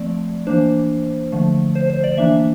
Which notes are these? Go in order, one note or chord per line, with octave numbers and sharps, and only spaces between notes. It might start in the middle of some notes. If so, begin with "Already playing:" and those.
Already playing: F3 A3 C4 D5
E3 A#3 D4 C5
D3 F3 A3
C5
C5
D5
E3 A#3 D4 E5